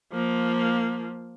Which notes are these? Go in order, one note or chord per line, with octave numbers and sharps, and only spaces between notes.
F3 A#3